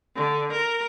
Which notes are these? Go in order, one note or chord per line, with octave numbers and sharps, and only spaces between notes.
D3
A#4